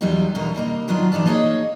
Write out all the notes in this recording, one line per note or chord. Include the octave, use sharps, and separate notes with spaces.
E2 F#3 G3 D#4 F4 G4
E2 B2 D3 D#4 A#4
C3 G3 A#3 D#4
D#3 F#3 B3 D4 D#4 F4
E3 D#4 G4 D5 A5
A#3 D#4 G#4 B4 C#5 D#5